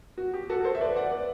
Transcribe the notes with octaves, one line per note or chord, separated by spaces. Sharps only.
F#4
G4
F#4 A4
A4 C5
E5
B4 D5
D5 F#5
B4 D5